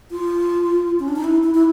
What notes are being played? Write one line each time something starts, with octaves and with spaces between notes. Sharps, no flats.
F4
C#4
D4
D#4
E4
E4
E4